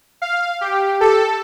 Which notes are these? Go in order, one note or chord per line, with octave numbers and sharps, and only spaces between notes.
F5
G4
A4